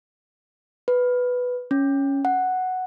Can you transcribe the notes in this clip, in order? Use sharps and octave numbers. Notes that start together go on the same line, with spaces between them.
B4
C#4
F#5